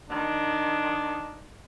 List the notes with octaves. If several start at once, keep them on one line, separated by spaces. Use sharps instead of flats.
D#3 D4